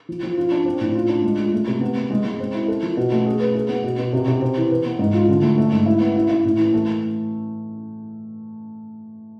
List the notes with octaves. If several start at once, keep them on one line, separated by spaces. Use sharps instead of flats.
F3
F3
F4
D4
C4
A2
F4
D4
G#3
F4
A3
C3
B3
B3
G#3
G#3
C4
E4
A4
F3
B2
A3
G#4
B4
G#4
B3
B2
B2
C3
C3
C4
E3
B4
B3
G#2
F4
D3
A3
A3
G#2
E4
B3
E4
E4
A2
E3
A3